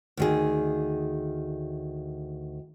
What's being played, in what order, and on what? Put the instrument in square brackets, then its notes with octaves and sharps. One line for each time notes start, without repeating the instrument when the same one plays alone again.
[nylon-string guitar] D2 D#3 G#4